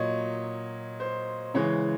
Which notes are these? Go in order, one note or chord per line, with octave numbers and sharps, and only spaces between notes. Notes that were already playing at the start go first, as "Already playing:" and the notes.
Already playing: A#2 F#3 C#5 D#5
C5
C#3 E3 G#3 C#5